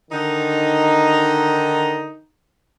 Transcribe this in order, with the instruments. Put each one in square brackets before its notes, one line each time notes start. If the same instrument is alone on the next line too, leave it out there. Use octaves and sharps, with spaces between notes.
[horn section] D3 D#3 D#4